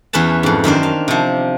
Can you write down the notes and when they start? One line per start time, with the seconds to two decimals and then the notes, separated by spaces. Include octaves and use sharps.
0.13 E2 B3 C#4 B4 A5
0.43 F2 G#2
0.64 F#2 D#3 D4 C5
0.83 F5
1.08 C3 F3